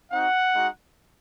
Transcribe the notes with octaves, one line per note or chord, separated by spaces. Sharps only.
C4 D#4 F#4 F#5
G#3 D#4 F#4